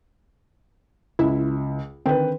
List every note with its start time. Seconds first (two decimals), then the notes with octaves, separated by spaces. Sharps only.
1.19 C#2 E4
2.06 D3 D#3 C4 B4 G5